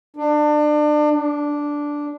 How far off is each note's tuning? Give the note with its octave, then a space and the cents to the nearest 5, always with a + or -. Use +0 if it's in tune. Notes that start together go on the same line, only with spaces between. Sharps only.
D4 +30
D4 -5